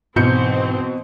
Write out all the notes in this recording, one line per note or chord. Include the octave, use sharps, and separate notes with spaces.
G#2 B2 E3 C4 G6 C#7